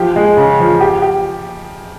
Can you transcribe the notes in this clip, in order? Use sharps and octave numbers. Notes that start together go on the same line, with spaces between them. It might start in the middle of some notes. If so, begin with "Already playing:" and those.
Already playing: F3 G4
G#3
C#3
F3
G4
G4